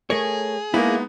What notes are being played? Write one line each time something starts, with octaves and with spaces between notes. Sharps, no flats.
A3 G#4 A#4 C#5
G#3 A#3 B3 D#4 E4 A#4